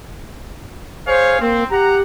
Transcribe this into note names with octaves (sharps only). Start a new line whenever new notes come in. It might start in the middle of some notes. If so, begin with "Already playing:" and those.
G#4 C5 C#5 F5
A#3 C4
G4 F#5 A#5